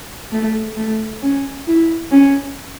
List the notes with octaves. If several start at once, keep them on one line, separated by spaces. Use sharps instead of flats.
A3
A3
C#4
E4
C#4